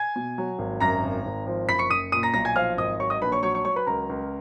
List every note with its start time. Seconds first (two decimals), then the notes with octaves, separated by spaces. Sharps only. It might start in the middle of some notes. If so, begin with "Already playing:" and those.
Already playing: G#5 G#6
0.16 B2
0.38 F#3
0.59 G#1
0.80 F#2 A#5 A#6
1.03 G#1
1.25 G#1
1.47 F3
1.68 F#1 B5 B6
1.79 C#6 C#7
1.90 F#1 D#6 D#7
2.12 A#2 D#6 D#7
2.23 A#5 A#6
2.34 B1 A#5 A#6
2.45 G#5 G#6
2.56 F3 F5 F6
2.77 G#1 D#5 D#6
3.00 F#3 C#5 C#6
3.10 D#5 D#6
3.22 A#1 B4 B5
3.32 C#5 C#6
3.43 F#3 C#5 C#6
3.54 C#5 C#6
3.65 F#3 C#5 C#6
3.76 B4 B5
3.86 C#2 A#4 A#5
4.09 C#2